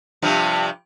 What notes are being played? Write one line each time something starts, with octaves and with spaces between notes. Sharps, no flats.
G2 C3 F3